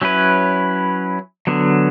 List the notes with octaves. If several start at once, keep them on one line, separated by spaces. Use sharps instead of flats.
F#3 C#4 E4 B4
D3 F#3 B3